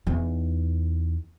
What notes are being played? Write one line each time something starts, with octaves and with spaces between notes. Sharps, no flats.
E2 D#4